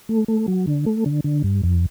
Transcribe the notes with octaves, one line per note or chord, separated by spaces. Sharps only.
A3
A3
F#3
D3
A3
D3
D3
G2
F2